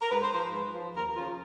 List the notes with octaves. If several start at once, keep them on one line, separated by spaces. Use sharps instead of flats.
A#4
G#2 B4
C5
F3 C5
B4
G#2
F3
D#2 A#4
C#3 F3 F4